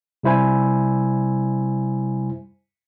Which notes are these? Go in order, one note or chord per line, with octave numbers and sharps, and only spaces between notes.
C3 G3 E4 C5 G#5